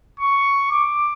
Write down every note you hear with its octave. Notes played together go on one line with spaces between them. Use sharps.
C#6
D6